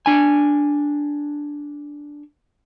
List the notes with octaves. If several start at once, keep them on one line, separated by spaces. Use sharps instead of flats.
D4 G#5